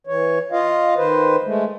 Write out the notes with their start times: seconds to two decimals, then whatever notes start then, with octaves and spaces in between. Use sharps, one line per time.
0.07 E3 C#5
0.52 F4 D#5 F5
0.96 D#3 B4 C5
1.44 G#3 A3